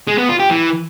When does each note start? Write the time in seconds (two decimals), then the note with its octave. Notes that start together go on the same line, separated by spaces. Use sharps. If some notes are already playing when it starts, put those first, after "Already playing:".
0.07 G#3
0.18 B3
0.29 F4
0.40 G4
0.50 E3